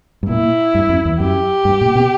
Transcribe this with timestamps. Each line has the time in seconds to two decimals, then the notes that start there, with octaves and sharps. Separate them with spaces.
0.23 G2
0.29 A#2 E4
0.75 G2
0.89 F#2
1.05 E2
1.19 F#2 G4
1.65 G2
1.81 A#2
1.95 B2